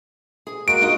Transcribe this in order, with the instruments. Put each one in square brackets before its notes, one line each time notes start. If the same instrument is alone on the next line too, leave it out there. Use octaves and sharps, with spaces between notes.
[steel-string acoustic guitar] G#4
[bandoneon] G#3 A#3 F#4 [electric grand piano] D7
[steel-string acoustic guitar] D#4 F4 D#5